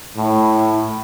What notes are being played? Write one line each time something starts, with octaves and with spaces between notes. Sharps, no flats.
A2